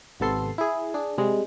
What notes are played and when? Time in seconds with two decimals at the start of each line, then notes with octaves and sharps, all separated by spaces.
0.20 G#1 C3 B3 A4 C6 C7
0.58 E4 G#4
0.94 D4 G#4
1.18 C3 G3 G#3